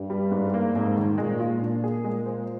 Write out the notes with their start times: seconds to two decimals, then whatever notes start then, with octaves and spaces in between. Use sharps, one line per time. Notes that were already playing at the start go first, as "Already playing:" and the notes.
Already playing: G2
0.10 G3
0.31 G#2
0.54 A#3
0.75 F2 G#2
0.97 D#3
1.18 A#2 G#3
1.40 F4
1.61 A#2 D4
1.84 G#4
2.04 G#3
2.26 C5